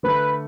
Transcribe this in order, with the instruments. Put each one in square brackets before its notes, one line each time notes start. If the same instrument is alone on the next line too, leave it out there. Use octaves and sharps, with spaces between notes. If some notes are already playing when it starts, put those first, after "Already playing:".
[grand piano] D3 A3 D4 A4 [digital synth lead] B4